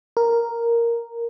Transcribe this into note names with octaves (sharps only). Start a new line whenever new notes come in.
A#4